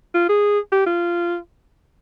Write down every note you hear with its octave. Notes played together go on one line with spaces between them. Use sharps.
F4
G#4
G4
F4